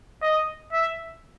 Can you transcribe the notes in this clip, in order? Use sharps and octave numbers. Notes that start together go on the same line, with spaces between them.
D#5
E5